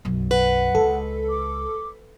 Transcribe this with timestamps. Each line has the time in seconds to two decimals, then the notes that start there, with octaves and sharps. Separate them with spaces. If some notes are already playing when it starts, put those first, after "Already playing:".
0.05 B1 F#2
0.31 B4 F#5
0.75 C#2 A4
1.30 D6